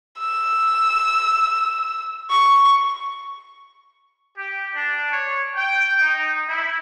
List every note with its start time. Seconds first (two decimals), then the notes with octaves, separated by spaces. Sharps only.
0.18 E6
2.31 C#6
4.37 G4
4.75 D4
5.11 C#5
5.56 G5
6.01 D#4
6.47 E4